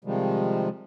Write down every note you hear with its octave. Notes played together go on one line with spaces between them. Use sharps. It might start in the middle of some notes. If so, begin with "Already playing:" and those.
C3 D#3 F3 G3 G#3